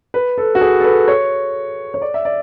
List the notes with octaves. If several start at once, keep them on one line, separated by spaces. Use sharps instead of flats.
B4
A4
F#4
G#4
A4
B4
C#5
C#5
D5
E5
D5